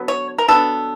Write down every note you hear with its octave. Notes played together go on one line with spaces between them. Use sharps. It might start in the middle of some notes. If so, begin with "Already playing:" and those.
Already playing: D3 F#3 B3
C#5
A#4
D3 F#3 B3 D4 A4